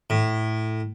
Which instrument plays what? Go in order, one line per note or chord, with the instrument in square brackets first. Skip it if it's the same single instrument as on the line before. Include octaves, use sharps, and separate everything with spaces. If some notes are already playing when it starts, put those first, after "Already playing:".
[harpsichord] A2